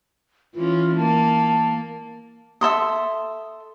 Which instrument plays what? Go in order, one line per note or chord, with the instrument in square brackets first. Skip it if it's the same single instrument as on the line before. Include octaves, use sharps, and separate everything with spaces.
[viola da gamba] E3 C#4 [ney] F4
[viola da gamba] A#3 [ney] A5
[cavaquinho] A4 E5 C6 D#6